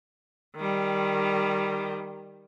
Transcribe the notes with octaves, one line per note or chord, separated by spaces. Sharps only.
D#3 G3